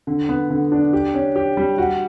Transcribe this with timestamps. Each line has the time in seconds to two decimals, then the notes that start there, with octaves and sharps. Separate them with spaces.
0.07 D3
0.29 B3
0.50 D3
0.72 D4
0.93 G4
1.14 C#4
1.36 G4
1.57 G3
1.78 F#4